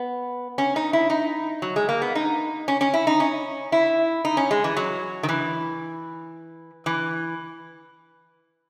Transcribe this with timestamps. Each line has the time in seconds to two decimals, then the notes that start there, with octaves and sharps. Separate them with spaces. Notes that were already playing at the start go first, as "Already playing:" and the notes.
Already playing: B3
0.58 C#4
0.76 D#4
0.93 E4
1.10 D#4
1.62 F#3
1.76 G#3
1.89 A#3
2.02 B3
2.15 D#4
2.68 C#4
2.81 C#4
2.94 E4
3.07 D#4
3.20 C#4
3.72 E4
4.25 D#4
4.37 C#4
4.51 G#3
4.64 E3
4.77 F#3
5.23 D#3
5.29 E3
6.86 E3